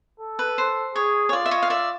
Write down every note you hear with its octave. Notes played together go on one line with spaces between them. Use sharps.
A4
B4
C5
G#4 C#5
C#5
F4 D5
E5
C#5 D#5
F5
D5 E5